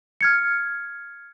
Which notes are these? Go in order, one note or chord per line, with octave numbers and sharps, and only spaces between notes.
F6 G#6 C#7